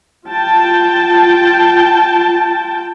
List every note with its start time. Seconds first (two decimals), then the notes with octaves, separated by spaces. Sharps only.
0.28 F4 G5 A5